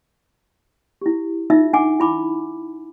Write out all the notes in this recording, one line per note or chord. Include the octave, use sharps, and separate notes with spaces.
E4 G4
D#4 F4 E5 E6
D4 F#5 G#5 D6
E4 B5 D6